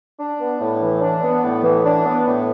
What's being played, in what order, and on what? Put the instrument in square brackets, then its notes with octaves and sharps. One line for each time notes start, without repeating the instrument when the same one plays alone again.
[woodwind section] D4
B3
A2
E3
D4
B3
A2
E3
D4
B3
A2